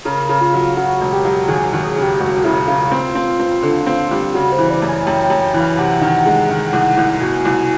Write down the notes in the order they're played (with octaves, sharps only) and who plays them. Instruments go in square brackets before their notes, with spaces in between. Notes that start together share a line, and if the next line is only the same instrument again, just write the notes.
[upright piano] C#3 [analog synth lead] A#4
[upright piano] C#3
[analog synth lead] F4
[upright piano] F#3
[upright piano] C#3 [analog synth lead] F#4
[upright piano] E1
[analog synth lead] G4
[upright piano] F#3
[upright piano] D#2 [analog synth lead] G#4
[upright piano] D#2
[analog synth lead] G#4
[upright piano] C#3
[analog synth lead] G4
[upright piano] E1 [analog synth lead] F#4
[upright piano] C#3 [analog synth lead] E4
[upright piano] C#3 [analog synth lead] F4
[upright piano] C4
C4
C4
D3
C4
G3
[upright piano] C#3 [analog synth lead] F#4
[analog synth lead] C5
[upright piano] E3
[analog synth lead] D5
[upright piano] F#2
[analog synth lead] G#5
[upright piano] F#2 [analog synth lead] G5
[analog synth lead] G5
[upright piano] F#2
[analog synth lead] G5
[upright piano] E3
[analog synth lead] F5
[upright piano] C3 [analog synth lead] F#5
[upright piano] D#3
G#3
D#3
C2
C2
[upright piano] B2 [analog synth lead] G#5
[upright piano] C2